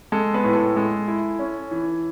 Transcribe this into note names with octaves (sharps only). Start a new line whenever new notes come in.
G#3 A4
B3 B4
A2
A4
G#3 A4
E4
C#4
E3